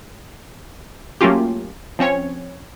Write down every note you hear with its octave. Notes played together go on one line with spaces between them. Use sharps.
F#3 A3 A#3 C#4 F4 G4
F3 C4 C#4 C#5